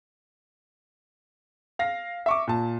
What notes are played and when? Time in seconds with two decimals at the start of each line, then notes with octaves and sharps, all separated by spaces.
1.79 F5 A#6
2.26 E5 C#6 D6
2.47 A#2 A5